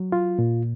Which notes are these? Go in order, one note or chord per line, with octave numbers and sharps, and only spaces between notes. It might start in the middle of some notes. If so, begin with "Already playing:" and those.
Already playing: F#3
F4
A#2